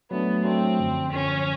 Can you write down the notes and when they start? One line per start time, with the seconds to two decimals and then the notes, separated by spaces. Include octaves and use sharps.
0.10 F#3 A3 B3 D4
0.44 F#3 A3 C4 D4
0.78 F#2 D3 F3
1.11 F#2 D3 F3 C#4